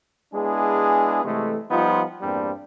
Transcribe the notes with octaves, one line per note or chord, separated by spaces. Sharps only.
G#3 B3 D4 E4 G#4
C3 E3 G#3 A3
F3 G3 B3 D#4 F4
E2 G2 G3 A#3 C4 D4